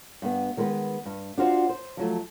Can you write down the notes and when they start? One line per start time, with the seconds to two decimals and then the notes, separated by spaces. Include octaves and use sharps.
0.22 G2 B3
0.57 D#3 G#3 B3 A#4 B4
1.05 G2
1.38 D4 F4 F#4 C5
1.69 C5
1.97 F3 F#3 A3